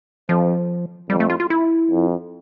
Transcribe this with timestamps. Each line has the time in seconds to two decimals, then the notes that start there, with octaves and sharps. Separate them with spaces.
0.29 F2 F3
1.10 F2 G3
1.20 A3
1.30 F4
1.40 F4
1.50 E4
1.90 F2